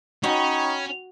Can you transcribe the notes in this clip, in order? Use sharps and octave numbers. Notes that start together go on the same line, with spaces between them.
C#4 D#4 F#4 G5 B5 C#6